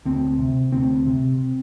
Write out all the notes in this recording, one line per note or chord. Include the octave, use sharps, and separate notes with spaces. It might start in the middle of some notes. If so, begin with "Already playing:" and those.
D2 C4
C3
D2 C4
C3